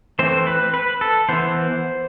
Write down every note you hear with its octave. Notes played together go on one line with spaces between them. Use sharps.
E3 A3 C4 C5
B4
B4
A4
E3 B3 C5